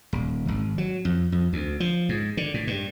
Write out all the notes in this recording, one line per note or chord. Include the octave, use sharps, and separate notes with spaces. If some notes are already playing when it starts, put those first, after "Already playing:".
D#1
G#1
F#3
F2
F2
D2
F3
G#2
D3
A2
G2